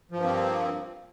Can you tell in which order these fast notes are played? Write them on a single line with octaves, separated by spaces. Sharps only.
F3 G2 A#3 C4